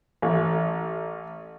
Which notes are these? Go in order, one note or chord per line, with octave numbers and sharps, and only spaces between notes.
A1